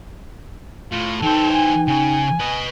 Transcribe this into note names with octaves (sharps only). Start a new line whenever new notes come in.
A2 F4
E3 D#4 A4 C5 G5
G#5
C#3 G#5
B4 D#5